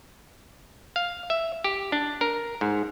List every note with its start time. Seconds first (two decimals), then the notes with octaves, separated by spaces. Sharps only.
0.96 F5
1.30 E5
1.64 G4
1.92 D4
2.21 A#4
2.61 G#2